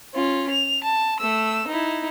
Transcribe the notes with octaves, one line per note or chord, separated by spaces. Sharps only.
C#4 F4
F7
A5
A3 E6
D#4 E4